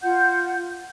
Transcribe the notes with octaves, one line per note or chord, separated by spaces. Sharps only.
F4 F#5 G6